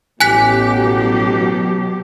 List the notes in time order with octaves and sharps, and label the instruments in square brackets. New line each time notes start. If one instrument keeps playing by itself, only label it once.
[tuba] A1 [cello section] B2 F#3 G4 [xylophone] G#5 F#6 B6